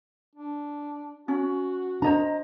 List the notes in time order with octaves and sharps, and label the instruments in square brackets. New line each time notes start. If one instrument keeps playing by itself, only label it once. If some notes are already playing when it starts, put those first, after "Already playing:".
[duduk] D4
[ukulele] C#4 [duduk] F#4
[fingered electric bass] D4 [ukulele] C5 D#5 A#5